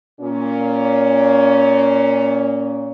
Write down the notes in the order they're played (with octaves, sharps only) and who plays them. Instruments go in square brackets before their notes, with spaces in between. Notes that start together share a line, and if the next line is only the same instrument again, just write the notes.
[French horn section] A#2 C#4